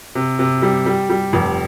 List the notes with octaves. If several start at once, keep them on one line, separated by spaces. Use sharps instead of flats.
C3
C3
G3
G3
G3
F1